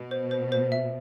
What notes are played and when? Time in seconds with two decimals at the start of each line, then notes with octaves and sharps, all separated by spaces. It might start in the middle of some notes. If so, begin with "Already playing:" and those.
Already playing: B2
0.11 C5
0.31 C5
0.52 C5
0.72 E5